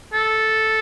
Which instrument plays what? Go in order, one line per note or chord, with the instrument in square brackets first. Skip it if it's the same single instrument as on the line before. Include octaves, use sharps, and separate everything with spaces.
[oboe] A4